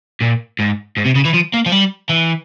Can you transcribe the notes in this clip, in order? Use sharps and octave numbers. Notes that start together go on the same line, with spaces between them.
A#2
G#2
G#2
C3
C#3
E3
F3
A#3
F3
G3
E3